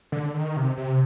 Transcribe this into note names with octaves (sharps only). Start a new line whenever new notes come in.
D3
D#3
C3
C3